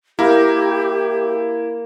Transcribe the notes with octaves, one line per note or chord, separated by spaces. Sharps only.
A#3 E4 G4